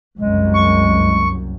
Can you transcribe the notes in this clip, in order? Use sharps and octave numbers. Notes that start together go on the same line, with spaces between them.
F#1 C2 F#2 G#3
C#6